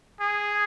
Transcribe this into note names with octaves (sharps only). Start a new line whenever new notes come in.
G#4